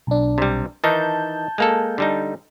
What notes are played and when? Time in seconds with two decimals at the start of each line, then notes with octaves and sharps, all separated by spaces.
0.07 B1 D4
0.38 C3 G3
0.84 D#3 E3 D#4 A5 G6
1.58 G#3 A#3 A4
1.98 D3 G3 D#4